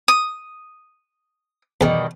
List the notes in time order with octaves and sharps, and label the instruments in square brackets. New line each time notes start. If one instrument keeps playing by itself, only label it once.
[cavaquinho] D#6
[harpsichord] E2 [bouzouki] B2 D#3 G3